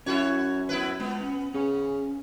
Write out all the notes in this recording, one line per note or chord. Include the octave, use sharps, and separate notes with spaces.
F#2 C#4 E4 F#4 C#5
B3 E4 B4
G#3 B3 F4
C#4
C#3 C#4